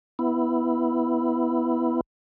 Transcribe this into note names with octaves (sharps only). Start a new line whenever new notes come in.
B3 E4